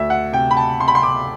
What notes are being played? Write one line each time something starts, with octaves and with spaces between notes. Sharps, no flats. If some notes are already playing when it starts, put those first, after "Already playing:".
Already playing: D2 E5
F#5
C3 G5
B5
A5
C3 C6
B5
C6
D6